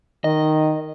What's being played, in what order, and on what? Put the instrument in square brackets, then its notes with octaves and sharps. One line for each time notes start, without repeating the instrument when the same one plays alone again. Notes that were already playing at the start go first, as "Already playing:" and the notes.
[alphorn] D#3 [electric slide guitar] D#5